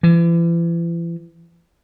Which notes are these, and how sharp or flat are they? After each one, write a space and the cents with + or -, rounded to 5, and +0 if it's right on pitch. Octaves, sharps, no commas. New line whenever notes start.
E3 +40